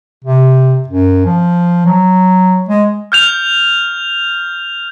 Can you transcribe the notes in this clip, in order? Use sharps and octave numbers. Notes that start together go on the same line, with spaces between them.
C3
F#2
F3
F#3
G#3
F6 G6 F7